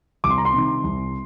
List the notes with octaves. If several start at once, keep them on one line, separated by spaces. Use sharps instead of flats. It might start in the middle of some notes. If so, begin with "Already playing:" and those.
C2 D6
C6
A#5
C6
C3 D#3
C2